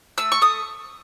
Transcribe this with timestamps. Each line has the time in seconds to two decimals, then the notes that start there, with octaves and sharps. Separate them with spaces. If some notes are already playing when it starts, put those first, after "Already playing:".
0.18 A3 E6
0.32 C#6
0.41 A3 D#6